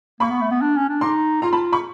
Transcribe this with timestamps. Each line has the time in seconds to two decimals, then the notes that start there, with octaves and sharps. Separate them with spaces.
0.20 A#3 B5 C#6
0.31 B3
0.41 A3
0.51 B3
0.62 D4
0.77 C#4
0.89 D4
1.01 D#4 C6 D6
1.42 F4 A#5 C6
1.53 A5 B5
1.73 B5 C#6